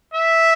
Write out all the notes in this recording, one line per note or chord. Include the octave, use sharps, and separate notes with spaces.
E5